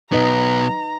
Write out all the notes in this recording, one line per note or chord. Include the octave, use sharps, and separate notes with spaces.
B1 B3 D#4 B4 D#5 A#5